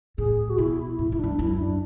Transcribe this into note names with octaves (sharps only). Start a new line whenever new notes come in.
A2 G#4
F#4
B2 E4
G#2 E4
F#2 E4
G#2 D4
F#2 E4
D4